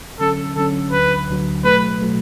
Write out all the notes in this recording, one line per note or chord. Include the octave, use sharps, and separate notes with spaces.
D3 F#3 C#4 A4
D3 F#3 C#4 A4
D2 D3 F#3 B4
D2 D3 F#3
B2 F#3 A3 B4
B2 F#3 A3